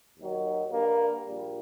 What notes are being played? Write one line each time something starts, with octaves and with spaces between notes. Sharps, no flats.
D#2 D#3 F#3
G2 D3 G3 A#3
A#1 A#2 G3